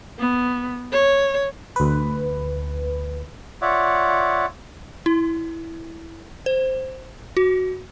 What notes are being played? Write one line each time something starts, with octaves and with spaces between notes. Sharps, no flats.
B3
C#5
D2 B4
F4 C#5 D5 E5 F#5
E4
C5
F#4